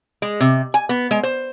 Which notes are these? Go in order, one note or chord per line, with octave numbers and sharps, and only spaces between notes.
G#3
C3
G#5
B3
G#3
C5